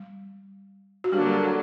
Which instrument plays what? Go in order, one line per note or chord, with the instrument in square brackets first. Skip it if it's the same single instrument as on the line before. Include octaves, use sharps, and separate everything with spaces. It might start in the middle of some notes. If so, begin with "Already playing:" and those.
Already playing: [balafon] G3
F#4
[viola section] D3 F#3 A#3 D4 [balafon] G3 G4